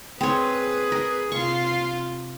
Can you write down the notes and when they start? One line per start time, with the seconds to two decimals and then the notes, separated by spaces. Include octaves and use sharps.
0.21 C4 G#4 B4 C#5
0.92 A#4
1.32 C3 F4 C#6